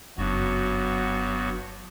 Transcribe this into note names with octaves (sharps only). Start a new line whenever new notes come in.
F#1 G2 F#3 B3 F#4